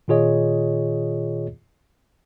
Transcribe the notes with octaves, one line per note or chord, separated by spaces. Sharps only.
A#2 D#3 F4 G#4 C#5 D#5